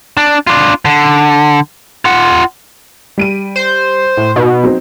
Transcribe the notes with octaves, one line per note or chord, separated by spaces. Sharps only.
D4
D4 F4
D3
F4 F#5
G3 D7 D#7
C5
A2
B2 D#4
F#3 C4 D#4